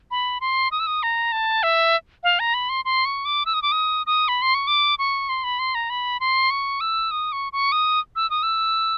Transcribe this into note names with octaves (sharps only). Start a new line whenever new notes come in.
B5
C6
D#6
E6
D#6
A#5
A5
E5
F5
A#5
B5
C6
C6
C#6
D6
E6
D#6
D6
D#6
D#6
B5
C6
C#6
D6
C#6
C6
B5
C6
A#5
B5
C6
C#6
E6
D#6
C#6
C#6
D#6
E6
D#6
E6